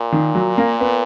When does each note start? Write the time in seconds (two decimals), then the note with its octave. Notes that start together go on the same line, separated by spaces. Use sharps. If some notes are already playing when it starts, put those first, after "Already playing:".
Already playing: A#2
0.12 D#3
0.35 F#3
0.58 A#3
0.81 B3